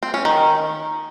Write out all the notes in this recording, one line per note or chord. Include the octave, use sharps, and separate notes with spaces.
C4
C#4
D#3